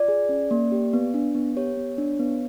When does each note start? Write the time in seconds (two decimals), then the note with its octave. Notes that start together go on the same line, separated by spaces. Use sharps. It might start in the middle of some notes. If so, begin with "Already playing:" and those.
Already playing: F4 D5
0.08 G#4
0.29 C#4
0.51 A#3
0.72 G4
0.93 B3
1.14 D4
1.35 B3
1.56 G4 C#5
1.77 B3
1.98 D4
2.19 B3